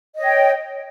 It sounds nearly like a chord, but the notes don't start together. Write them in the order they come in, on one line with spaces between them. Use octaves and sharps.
D#5 C#5 G5